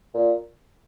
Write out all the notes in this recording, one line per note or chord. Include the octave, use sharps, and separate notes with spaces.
A#2